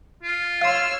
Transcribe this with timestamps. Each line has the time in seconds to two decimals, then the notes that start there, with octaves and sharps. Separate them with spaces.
0.23 F4
0.61 C#5 F5 C6 E6 F6